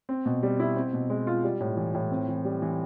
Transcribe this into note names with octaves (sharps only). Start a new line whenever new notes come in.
C4
B2
G3
E4
C4
B2
G#3
F4
G3
A2
E3
A2
C4
E3
G3
E3